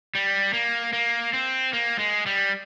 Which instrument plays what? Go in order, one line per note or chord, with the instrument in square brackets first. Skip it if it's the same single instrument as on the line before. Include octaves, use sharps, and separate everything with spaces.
[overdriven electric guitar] G3
A#3
A#3
C4
A#3
G#3
G3